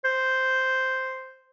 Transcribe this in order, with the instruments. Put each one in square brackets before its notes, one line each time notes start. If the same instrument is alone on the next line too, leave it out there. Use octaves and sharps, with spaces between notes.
[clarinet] C5